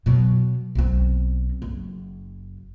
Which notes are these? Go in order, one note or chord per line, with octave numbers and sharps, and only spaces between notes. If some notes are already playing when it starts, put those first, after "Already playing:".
B2 F#3
B1 C4
F#1